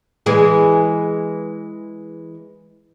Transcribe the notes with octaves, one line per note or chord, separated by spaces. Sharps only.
E3 G#3 G#4